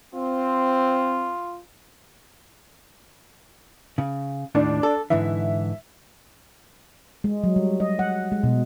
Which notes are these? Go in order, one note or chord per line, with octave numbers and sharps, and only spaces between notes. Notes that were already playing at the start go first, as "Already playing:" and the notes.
C4 F4
C#3
D#2 A2 D#3 D4
A4
G#2 D3 E3 E5
G#3
F#3
G3
D#5
F#5
G#3
B2